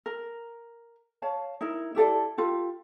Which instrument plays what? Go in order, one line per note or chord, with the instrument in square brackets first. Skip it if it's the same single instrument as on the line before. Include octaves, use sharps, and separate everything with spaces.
[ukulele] A#4
C#5 F5 A5
D#4 E4 A#4
E4 G4 A4 D5
F4 G4 A4